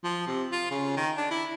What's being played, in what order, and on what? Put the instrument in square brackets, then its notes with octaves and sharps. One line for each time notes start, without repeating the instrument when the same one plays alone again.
[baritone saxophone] F3
C3
F4
C#3
D#3
D4
E4